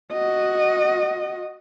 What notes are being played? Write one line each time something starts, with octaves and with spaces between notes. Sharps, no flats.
F#4 D#5